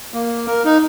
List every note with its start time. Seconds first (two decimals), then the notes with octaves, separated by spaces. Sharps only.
0.14 A#3
0.47 A#4
0.65 D#4